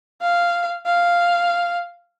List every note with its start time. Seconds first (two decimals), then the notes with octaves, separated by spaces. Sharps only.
0.21 F5
0.86 F5